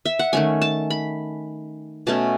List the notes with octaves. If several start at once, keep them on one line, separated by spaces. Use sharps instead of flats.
E5
F#5
D#3 A3 C#4 G#5
A5
B5
B2 A3 C#4 A5